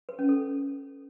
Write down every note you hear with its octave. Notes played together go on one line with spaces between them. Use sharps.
B4
C#4
A4